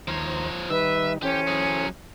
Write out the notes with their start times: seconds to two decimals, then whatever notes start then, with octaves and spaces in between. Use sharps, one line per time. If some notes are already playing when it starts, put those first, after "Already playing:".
0.08 D#2 F3 C5 C#5 A#5
0.70 D#3 G3 D#4 B4 E5
1.23 E3 C#4 G4 A4 C5
1.47 F#3 G#4